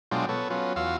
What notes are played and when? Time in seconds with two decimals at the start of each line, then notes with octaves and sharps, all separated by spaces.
0.11 B2 F#3 G#3 D4 F4 G5
0.29 B3 A4 C#5
0.50 F#3 B3 C#4 F4
0.76 E2 F4 F#4 F5 E6